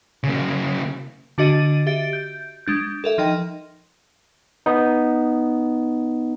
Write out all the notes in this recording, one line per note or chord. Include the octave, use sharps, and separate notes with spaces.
C#3 A#3
D3 D4 F#4 D#5 A6 D#7
G4 E5 A6 D7
G6
G#3 D4 G6
A4 A#4 E5
F3 D#4 D#5 G5
B3 D#4